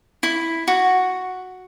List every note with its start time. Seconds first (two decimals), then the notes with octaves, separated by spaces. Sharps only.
0.23 E4
0.68 F#4